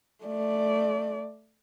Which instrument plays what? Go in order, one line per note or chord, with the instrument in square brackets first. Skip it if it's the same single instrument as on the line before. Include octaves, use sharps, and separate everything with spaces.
[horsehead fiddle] A3 D5